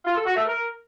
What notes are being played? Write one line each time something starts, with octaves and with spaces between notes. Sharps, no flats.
F4
A4
F#4
A3
A#4